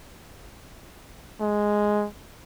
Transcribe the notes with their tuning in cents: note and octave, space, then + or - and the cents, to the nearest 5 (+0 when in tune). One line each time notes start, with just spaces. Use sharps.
G#3 +0